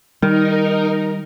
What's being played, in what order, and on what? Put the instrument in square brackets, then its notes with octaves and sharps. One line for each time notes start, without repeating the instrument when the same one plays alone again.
[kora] D#3 [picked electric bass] G3 [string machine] D#4 A#4